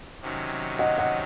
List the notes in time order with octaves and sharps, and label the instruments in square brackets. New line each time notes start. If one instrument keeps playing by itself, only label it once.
[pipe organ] C3 D#3 F#3 C#4
[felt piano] D#5 F#5
D#5 F#5